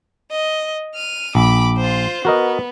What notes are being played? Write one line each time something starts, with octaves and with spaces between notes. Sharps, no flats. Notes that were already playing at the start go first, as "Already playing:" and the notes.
D#5
F6 D#7
A#1 B5 D6
F4 C5
B3 F#4 A#4 D#5